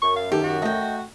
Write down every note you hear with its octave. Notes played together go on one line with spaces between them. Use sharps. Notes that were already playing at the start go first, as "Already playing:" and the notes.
F#2 C#6
F5
D#3 G4 A4
F#4
A3 D#5 G5